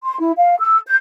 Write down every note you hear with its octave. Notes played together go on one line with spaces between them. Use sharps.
C6
E4
F5
E6
G6